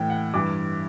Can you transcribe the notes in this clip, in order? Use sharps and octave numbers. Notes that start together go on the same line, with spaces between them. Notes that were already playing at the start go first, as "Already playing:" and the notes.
Already playing: A2 E3 G5
F#5
G2 E3 D6